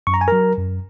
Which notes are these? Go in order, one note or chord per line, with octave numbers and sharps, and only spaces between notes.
F#2 C#6
A#5
G#5
F#3 A#4 A#5
F#2